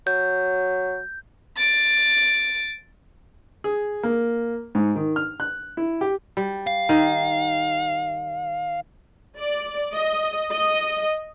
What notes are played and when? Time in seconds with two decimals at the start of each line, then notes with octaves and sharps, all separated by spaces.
0.07 F#3 G6
1.57 A6 D7
3.64 G#4
4.03 A#3
4.75 G#2
4.96 D#3
5.16 F6
5.40 F#6
5.77 E4
6.01 G4
6.37 G3
6.67 F5
6.89 D#3
9.38 D5
9.93 D#5
10.53 D#5